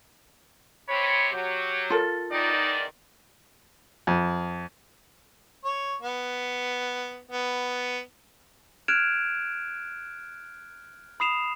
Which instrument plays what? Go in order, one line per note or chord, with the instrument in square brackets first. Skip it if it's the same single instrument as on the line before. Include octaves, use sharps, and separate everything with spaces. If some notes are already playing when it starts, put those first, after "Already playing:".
[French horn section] C3 C#5 [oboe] B5
[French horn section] F#3 [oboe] G4
[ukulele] F4 A4 A#4
[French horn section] E2 D#3 D5 [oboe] D#4
[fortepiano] F2
[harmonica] C#5
B3
B3
[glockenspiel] F6 F#6 G#6 D7 E7 F7
B5 D#6 C7 E7 F7